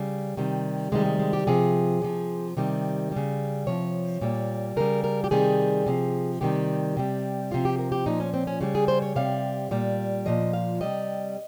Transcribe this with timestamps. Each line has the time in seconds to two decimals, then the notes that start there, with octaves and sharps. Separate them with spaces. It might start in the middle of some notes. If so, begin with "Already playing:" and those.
Already playing: C#3 G3
0.37 C3 D#3 G3
0.92 C3 D#3 G3 G#3
1.06 G#3
1.19 G#3
1.33 G4
1.47 C3 F3 G#4
2.02 C3 F3
2.57 C3 D#3 G3
3.12 C#3 G3
3.67 C3 F3 C#5
4.21 A#2 G3
4.76 C#3 G3 A#4
5.04 A#4
5.24 G4
5.31 C3 D#3 G3 G#4
5.86 C3 F3
6.41 C3 D#3 G3 G4
6.97 C3 G3
7.51 C3 F3 F4
7.65 G4
7.79 A#4
7.92 G4
8.06 A#2 F3 D#4
8.20 C#4
8.34 C4
8.47 C#4
8.61 C#3 G3
8.75 G#4
8.88 C5
9.02 C#5
9.16 C3 G3 F5
9.71 A#2 G3
10.26 A#2 F3 D#5
10.53 F5
10.81 C3 G3 D#5